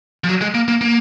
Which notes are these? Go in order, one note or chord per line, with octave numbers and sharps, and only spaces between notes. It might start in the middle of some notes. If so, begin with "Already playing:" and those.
F3
F#3
G#3
A#3
A#3
A#3